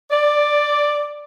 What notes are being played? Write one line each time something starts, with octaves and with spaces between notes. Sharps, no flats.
D5